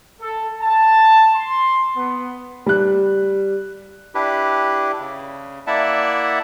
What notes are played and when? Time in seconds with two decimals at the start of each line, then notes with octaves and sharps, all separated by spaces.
0.20 A4
0.61 A5
1.36 C6
1.96 B3
2.66 G3 F#6
4.15 D4 E4 G4 B4
4.99 C#3
5.67 A#3 E4 D5 E5 F#5 A5